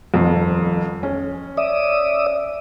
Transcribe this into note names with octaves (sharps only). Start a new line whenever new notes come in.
D#1 F2
C#4
D5 E5 D#6